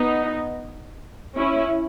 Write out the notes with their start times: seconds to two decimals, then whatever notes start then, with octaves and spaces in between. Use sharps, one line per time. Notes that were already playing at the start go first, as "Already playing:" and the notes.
Already playing: B3 D#4
1.36 C#4 E4